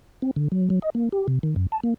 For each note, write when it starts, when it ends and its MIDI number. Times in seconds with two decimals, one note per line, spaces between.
0.22 0.31 60
0.36 0.48 50
0.52 0.69 54
0.70 0.79 54
0.82 0.90 75
0.95 1.09 58
1.12 1.27 67
1.28 1.39 48
1.43 1.55 51
1.56 1.67 42
1.72 1.80 81
1.84 1.94 58